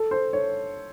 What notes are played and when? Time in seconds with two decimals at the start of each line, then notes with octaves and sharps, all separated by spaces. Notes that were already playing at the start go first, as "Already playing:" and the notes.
Already playing: A4
0.11 C5
0.33 C#5